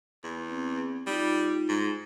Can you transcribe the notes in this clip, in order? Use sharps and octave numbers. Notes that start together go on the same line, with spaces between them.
E2
C4
G3 D#4 F4
G#2